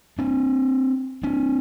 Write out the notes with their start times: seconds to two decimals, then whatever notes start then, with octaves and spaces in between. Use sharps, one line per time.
0.19 C4 D4
1.23 C4 D4